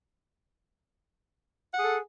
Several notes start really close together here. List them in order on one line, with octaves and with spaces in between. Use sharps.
F#5 G#4 A4